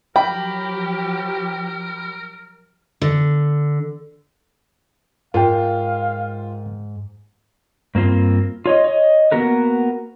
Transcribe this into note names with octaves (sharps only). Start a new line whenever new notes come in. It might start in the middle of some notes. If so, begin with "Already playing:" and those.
F3 F#3 G4 A#4 G5 B5
D3
G#2 F4 A#4 F5 G5
G2 A#3 C4 F4
F4 C#5 D#5
C#5 D#5
A#3 B3 F#4 A#4 B4